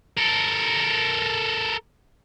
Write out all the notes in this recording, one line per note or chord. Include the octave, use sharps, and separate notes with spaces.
A4 A#4